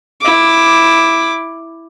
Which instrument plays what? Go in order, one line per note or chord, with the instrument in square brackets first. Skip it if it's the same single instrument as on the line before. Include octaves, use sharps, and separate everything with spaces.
[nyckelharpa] E4 D6